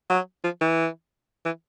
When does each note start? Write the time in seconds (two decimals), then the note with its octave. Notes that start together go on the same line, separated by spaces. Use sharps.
0.10 F#3
0.44 F3
0.61 E3
1.45 E3